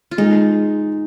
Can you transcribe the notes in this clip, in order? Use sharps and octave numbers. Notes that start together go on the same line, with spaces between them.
F4
G#3 D#4